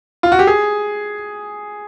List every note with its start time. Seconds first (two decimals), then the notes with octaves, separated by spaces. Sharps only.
0.23 F4
0.32 F#4
0.39 G4
0.47 G#4